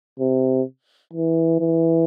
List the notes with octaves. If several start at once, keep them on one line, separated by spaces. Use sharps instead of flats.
C3
E3
E3